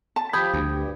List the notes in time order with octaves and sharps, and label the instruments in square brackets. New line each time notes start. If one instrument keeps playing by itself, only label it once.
[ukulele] A5
[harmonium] F3 G4 [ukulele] B5 [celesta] D#6 G6 G#6
[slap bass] D2
[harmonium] G2 G4